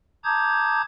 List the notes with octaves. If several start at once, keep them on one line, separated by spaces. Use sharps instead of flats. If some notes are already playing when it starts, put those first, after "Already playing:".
A5 A#5 D6 D#6 G6 G#6